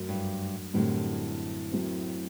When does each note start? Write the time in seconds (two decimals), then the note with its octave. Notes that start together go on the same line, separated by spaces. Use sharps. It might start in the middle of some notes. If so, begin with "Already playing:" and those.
Already playing: F#2 F#3 A3
0.09 G2
0.74 F#2 A2 D3 G3 C4 G4
1.72 F#2 F#3 A3 C4